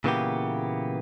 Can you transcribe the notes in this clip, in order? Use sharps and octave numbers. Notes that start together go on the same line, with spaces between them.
A#2 C#3 E3 A#3 B3 G4